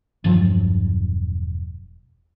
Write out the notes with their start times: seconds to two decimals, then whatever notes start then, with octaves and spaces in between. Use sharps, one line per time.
0.24 E1 G2 F3 F#3